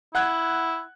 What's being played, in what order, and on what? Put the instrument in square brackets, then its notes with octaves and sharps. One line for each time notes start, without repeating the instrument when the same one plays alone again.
[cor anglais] E4 [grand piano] F#5 F#6 G#6